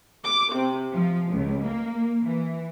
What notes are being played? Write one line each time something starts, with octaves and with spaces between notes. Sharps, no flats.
D6
C3
F3
C#2
A#3
E3